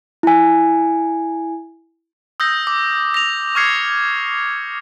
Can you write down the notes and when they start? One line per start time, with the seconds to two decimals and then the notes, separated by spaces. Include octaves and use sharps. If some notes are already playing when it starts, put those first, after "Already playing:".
0.23 E4 G#5
2.40 D#6 E6 G6 A#6
2.67 D6
3.14 A#6 F7
3.55 C#6 D6 F6 G#6 C7 C#7